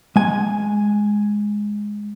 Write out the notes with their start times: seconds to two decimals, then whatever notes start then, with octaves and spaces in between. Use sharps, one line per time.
0.16 G#3 G#5